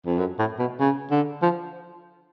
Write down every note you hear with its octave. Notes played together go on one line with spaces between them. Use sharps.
F2
F#2
A2
B2
C#3
D3
F3